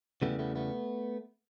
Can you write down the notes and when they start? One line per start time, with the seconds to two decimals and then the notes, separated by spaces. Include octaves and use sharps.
0.22 E2 C#3 E3 G3 A3 B3
0.39 A3 B3
0.56 A3 B3